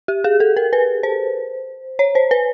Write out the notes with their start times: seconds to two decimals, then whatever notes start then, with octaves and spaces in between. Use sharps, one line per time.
0.08 G4
0.24 G#4
0.40 A4
0.57 A#4
0.73 B4
1.03 C5
1.99 C#5
2.15 C5
2.31 B4